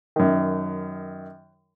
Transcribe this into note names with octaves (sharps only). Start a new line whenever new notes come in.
F#2 D#3